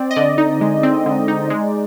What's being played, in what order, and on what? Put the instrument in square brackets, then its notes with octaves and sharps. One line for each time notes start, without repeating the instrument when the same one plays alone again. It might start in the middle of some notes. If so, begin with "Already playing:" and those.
Already playing: [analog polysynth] C4 D5
D#5
D3 D5
D#4
G#3
C4
D3
D#4
G#3